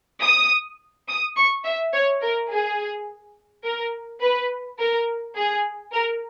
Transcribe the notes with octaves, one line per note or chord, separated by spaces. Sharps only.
D#6
D#6
C#6
E5
C#5
A#4
G#4
A#4
B4
A#4
G#4
A#4